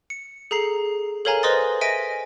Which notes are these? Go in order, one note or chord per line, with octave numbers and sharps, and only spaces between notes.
C#7
G#4 A4 A#5 C7
A4 A#4 C#5 F5 G#5 A#5
B4 C5 D#5 C6 D#6 A6
D#5 E5 G#5 A#6 D7